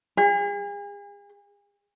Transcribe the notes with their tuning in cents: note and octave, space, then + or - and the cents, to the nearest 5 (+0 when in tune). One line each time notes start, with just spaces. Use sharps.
G#4 -40